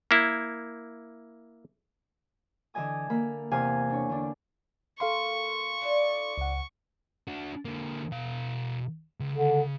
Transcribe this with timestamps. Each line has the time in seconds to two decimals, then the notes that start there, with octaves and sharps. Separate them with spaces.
0.11 A#3 E4
2.74 D3 E3 D#5 G#5 D#6
3.10 D3 A#3 A#4 B5
3.51 E2 C3 F5 G#5 F6 F#6
3.90 D4 C#5
4.10 D3 D4
5.00 A#3 A4 F5 C6 C#6
5.81 D4 E4 D5
6.38 C#2 F#5
7.28 D4 F#4
7.65 D3 A#3
8.12 B2 F5
9.20 C#2
9.35 D3